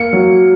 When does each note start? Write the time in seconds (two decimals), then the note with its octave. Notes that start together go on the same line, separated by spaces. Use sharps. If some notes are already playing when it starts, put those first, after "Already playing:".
Already playing: A#3 C#7
0.13 F#3